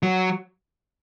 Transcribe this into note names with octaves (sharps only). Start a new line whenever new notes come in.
F#3